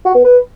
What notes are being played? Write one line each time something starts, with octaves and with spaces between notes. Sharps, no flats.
F#4
B3
B4